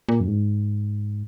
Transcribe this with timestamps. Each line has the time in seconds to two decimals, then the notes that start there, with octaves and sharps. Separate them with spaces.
0.09 A#2
0.20 F#2
0.28 G#2